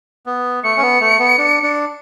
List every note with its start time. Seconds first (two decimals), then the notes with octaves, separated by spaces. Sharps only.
0.26 B3
0.63 A3 C#7
0.77 C#4
0.82 B3
1.01 A3
1.19 B3
1.38 D4
1.63 D4